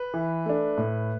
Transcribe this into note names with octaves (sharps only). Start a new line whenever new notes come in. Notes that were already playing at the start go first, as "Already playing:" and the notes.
Already playing: B4
E3
A3 D4
A2